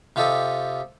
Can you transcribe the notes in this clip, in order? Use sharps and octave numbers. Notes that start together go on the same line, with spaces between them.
C3 F4 G4 A4 D#5